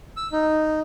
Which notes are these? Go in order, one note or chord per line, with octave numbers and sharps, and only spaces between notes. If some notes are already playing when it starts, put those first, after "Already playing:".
E6
D#4